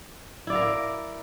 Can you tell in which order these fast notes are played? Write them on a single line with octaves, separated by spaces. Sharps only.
E4 D5 F5 A#4